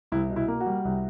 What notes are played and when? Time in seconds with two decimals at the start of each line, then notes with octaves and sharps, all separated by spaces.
0.12 C2 E4
0.30 B2
0.36 E4
0.48 A#3
0.60 F#4
0.66 G3
0.85 C2